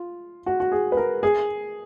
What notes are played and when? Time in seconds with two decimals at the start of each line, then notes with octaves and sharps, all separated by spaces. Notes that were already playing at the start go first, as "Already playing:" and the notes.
Already playing: F4
0.46 F#4
0.60 F#4
0.72 G#4
0.92 B4
0.97 A#4
1.23 G#4